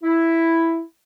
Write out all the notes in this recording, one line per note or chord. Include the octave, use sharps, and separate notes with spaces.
E4